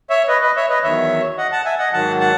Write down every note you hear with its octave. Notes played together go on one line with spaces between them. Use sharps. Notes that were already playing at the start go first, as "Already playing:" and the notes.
C#5 E5
B4 D#5
B4 D#5
C#5 E5
B4 D#5
E2 D#3 F#3 C#5 E5
D#5 F#5
F#5 A5
E5 G#5
D#5 F#5
G#2 D#3 F#3 F#5 A5
F#5 A5